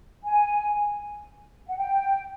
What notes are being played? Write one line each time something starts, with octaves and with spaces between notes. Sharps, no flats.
G#5
F#5
G5